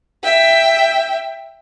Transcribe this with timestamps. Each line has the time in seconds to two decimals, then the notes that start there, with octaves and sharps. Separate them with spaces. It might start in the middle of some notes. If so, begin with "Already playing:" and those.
0.23 E5 G5